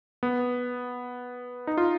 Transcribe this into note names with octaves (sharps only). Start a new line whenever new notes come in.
B3
D#4
F4